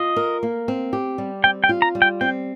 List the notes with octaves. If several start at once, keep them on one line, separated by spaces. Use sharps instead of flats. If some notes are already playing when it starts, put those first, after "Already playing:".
Already playing: F4 D#5
A#4
A#3
C4
G4
G3
C4 G5
G5
F4
A#5
G3
G5
C4 G5